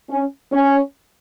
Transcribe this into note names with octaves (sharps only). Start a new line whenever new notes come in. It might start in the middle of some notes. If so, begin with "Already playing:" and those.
C#4
C#4